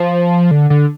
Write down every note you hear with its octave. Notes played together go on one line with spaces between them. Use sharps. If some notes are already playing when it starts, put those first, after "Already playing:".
Already playing: F3
D3
D3